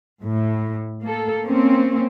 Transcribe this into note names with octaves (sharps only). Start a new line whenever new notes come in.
A2
A#3 A4
A#3 C4 C#4